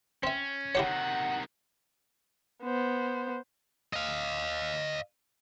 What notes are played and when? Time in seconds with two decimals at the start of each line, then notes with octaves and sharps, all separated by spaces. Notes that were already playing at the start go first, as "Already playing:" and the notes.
0.23 C4 C#4 E5
0.75 C3 D#3 E4 G4 C#5 F#5
2.63 B3 C5
3.93 D#5 F5